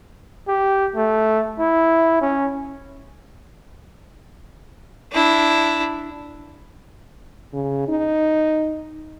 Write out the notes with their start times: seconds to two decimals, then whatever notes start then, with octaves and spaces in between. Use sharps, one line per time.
0.48 G4
0.96 A3
1.59 E4
2.21 C#4
5.12 D4 E4
7.53 C#3
7.88 D#4